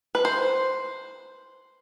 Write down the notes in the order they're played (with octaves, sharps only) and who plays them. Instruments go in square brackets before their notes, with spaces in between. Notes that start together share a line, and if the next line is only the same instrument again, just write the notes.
[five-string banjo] B4
C5